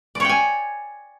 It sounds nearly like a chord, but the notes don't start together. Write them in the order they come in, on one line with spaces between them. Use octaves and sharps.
D5 C#5 G5 G#5